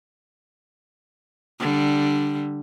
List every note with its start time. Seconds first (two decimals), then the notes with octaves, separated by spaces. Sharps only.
1.60 D3 G3